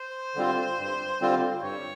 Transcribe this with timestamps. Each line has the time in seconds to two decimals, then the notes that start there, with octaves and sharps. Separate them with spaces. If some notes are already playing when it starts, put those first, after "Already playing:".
Already playing: C5
0.35 D3 G3 C4 F4
0.79 G2
1.21 D3 G3 C4 F4
1.62 G2 C#5